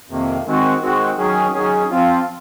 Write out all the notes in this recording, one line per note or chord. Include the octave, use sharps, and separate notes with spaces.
F2 C3 D#3 A#3
D#3 G#3 C4 F#4
D#3 G#3 C4 F#4
D#3 F#3 C#4 G#4
D#3 F#3 C#4 G#4
F3 C4 F4